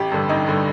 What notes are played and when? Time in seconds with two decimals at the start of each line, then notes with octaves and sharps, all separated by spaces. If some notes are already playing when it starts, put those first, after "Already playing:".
Already playing: A1 G4
0.12 G2 D3
0.29 A1 D#4
0.47 G2 D3